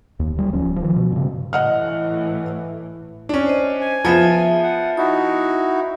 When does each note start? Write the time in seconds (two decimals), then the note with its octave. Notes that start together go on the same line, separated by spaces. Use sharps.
0.19 D#2
0.36 D2 G3
0.53 D1 F3 C#4
0.76 D#3 F3
0.96 B2
1.12 G2 C#3
1.53 A2 E3 D#5 F#5 F6
3.29 C#4 D4
3.46 C5 D#5
3.81 G#5
4.05 F3 B3 G#4 E5
4.63 F#5
4.97 D#4 E4 F#4 D#6